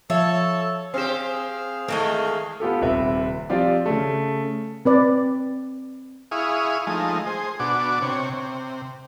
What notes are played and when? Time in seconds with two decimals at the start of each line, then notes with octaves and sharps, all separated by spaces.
0.10 F3 A4 C#5 E5 A5
0.94 C4 G4 G#4 C5 F5 E7
1.88 D#3 E3 G#3 A3
2.60 B3 F4 G4 A4
2.82 D#1 C3 B4 E5
3.50 F3 C4 F4 G4 D5
3.86 C#3 A3
4.85 C4 B4 D5
6.31 E4 G#4 F5 C#6 D#6
6.87 F3 G#3 A3 D#4
7.26 G#4 C5
7.60 B2 D4 F#4 D6
8.02 C3 C#5
8.33 C3